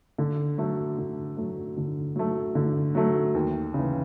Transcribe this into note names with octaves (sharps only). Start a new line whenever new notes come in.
D3
F#3 A3
D3
F#3 A3
D3
F#3 A3
D3
F#3 A3
D#2
C#3 E3